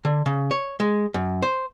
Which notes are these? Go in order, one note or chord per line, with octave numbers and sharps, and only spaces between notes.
D3
C#3
C#5
G#3
F#2
C5